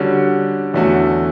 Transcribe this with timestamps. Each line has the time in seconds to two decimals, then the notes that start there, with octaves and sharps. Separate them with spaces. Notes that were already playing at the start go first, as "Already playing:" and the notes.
Already playing: D3 G3 C#4 F#4
0.74 E2 D3 A3 C#4 F#4